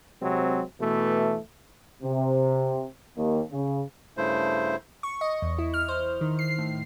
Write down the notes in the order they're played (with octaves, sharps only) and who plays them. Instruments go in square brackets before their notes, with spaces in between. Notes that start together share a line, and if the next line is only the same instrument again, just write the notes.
[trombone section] C3 F#3 G#3 C4
B2 E3 A3
[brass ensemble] C3
D#2
C#3
[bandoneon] G2 C#3 A3 E4 C5
[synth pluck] C#6
D#5
E2
E4
F6
C5
D#3
C7
A2